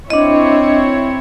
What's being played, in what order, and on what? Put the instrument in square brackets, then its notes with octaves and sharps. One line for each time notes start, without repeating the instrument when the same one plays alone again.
[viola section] C4 E4 C#5 [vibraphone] D4 D#5